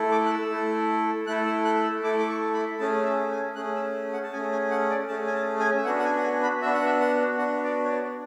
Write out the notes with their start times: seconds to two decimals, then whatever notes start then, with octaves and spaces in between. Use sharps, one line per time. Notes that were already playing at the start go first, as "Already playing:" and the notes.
Already playing: A3 E4 A4
0.12 D6
0.26 F#6
0.30 E6
0.51 A3 E4 A4
1.27 A3 E4 A4 F#6
1.46 E6
1.65 F#6
1.83 E6
2.03 A3 E4 A4 D6
2.19 D6
2.29 C#6
2.54 B5
2.79 A3 C#4 G#4 A5
3.04 E5
3.31 G#5
3.55 A3 C#4 G#4 F#6
3.76 E6
4.13 F#5
4.23 A5
4.32 A3 C#4 G#4 G#5
4.52 G#5
4.71 F#5
4.90 D5
5.08 A3 C#4 G#4 A5
5.27 G#5
5.34 A5
5.60 G#5
5.76 E5
5.85 B3 D4 F#4 F#5
5.99 F#5
6.05 G#5
6.17 F#5
6.23 G#5
6.43 B5
6.62 B3 D4 F#4 E5
6.73 F#5
6.85 E5
7.00 F#5
7.38 B3 D4 F#4 F#5
7.64 D5
7.84 C#5
7.89 D5